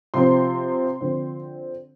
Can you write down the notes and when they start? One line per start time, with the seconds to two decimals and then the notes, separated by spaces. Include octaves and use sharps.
0.14 C3 F3 C4 C6
1.01 D3 F3 C4